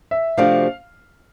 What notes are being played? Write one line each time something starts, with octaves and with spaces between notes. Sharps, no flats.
E5
C3 F3 A3 D4 F#4 F5